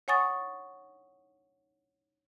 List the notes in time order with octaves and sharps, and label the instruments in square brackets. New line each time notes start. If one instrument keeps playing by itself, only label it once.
[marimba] C#5 F#5 G#5 C#6 D#6 A6